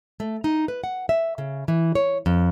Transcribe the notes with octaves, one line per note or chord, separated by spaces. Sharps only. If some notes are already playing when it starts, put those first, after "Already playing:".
A3
D#4
B4
F#5
E5
C#3
E3
C#5
F2